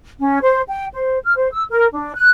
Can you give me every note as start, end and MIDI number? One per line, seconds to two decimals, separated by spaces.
0.20 0.38 61
0.42 0.61 72
0.69 0.86 79
0.93 1.18 72
1.23 1.34 89
1.36 1.48 72
1.52 1.63 88
1.70 1.88 70
1.95 2.13 62
2.15 2.28 90